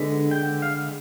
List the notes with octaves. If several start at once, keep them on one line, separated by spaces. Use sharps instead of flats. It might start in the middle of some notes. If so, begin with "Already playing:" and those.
Already playing: D3 G#3 B3
G5
F5